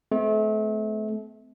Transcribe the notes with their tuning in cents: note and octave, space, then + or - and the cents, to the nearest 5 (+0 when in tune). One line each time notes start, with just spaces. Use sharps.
A3 -35 C4 -45